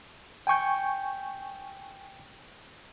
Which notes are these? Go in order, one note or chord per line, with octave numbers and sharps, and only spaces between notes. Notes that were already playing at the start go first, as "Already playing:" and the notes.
G5 G#5 C#6 G6